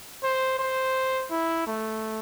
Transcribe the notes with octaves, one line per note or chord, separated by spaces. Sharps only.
C5
C5
E4
A3